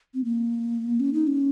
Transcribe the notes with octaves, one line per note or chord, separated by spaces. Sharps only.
C4
A#3
C#4
D#4
C#4